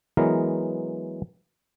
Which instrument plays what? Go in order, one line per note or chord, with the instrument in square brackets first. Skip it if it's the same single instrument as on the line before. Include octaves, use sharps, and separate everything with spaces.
[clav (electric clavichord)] E3 F#3 G#3 B3 A#4